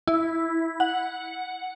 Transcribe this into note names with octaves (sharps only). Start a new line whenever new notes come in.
E4
F#5